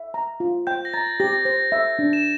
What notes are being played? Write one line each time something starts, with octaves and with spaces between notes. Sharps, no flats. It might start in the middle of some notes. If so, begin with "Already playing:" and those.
Already playing: E5
A#5
F4
G5 G6
A#6
A#5 A6
G4 A#6
C5 A#6
E5
D4
E7